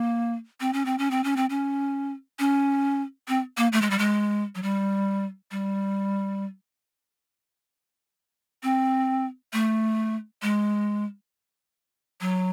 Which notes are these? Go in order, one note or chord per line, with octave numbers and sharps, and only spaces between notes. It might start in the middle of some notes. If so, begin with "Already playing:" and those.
Already playing: A#3
C4
C#4
C4
C#4
C4
C#4
C4
C#4
C#4
C4
A#3
A3
G#3
G3
G#3
F#3
G3
G3
C4
A3
G#3
F#3